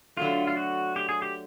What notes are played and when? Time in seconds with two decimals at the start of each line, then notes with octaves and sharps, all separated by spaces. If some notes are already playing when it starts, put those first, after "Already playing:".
0.17 D3 F#3 A3 F4
0.47 F4
0.57 F#4
0.96 G4
1.09 G#4
1.22 G4